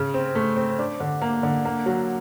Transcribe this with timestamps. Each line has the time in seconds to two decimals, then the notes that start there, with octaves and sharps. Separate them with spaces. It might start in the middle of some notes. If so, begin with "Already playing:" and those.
Already playing: C#3
0.14 C4
0.35 A3
0.57 C4
0.79 D4
1.00 D3
1.22 A#3
1.43 D3
1.65 A#3
1.86 F#3